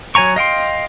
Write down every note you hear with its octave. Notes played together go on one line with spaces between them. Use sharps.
F#3 C#5 G#5 A#5 C#6
D#5 F5 G5 C6